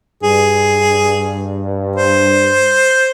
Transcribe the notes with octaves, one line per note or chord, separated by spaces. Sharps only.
G2 G#4
C5